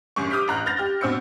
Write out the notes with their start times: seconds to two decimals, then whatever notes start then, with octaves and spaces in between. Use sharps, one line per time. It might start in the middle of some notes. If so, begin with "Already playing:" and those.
0.16 G#1 F#2 C#6
0.30 D6 D#6 F6 G6 B6 D7
0.48 A1 A#5 F#6
0.66 F6 G6 A6 A#6 F7
0.78 G4 F6
1.01 B2 C4 E6 G6 C#7